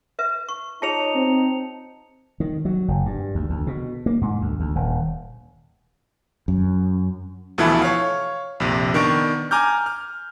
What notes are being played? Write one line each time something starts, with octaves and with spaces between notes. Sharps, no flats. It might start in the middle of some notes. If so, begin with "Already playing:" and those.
B4 E5
C#6
D#4 F4 G#4 C#5 A5 C#7 F7
C4
D#3
F#3
F#1
G2
D2
D2
B2
A#3
G#2
D2
D2
D#1
F#2
D2 B2 E3 F3 E4 A4
C#5 F5
A#1 F2 C3
D#3 B3 D4 C#6 D7
G#5 A#5 D6 F6 G6
F6